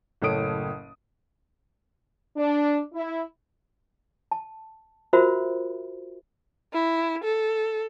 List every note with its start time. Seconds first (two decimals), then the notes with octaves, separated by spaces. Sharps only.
0.22 F#1 A2 A4 C#5 D#6 D7
2.36 D4
2.93 E4
4.31 A5
5.13 F4 F#4 A#4 C5 E5 B5
6.74 E4
7.24 A4